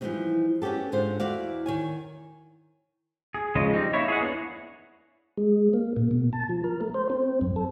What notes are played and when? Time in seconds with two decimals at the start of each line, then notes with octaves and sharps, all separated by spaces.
0.01 E3 F3 G3 A#3 C#4 D#4
0.62 B3 C#4 F#4 G4 A4
0.92 G#2 D3 F4 C5
1.20 E2 E4 F#4 D5 F5
1.66 D#3 C#5 G#5
3.35 G#4
3.55 C#3 F3 G#3 D#5
3.73 G3 C4 D#4
3.93 A#3 D#4 E4 C#5
4.08 G#4 C#5 F#5
4.21 B3 D4 E4 C#5
5.37 G#3
5.73 A#3
5.97 A#2
6.11 B2
6.33 A5
6.49 F3
6.64 A#4
6.81 A3
6.94 C5
7.10 C4
7.41 F#2
7.56 A4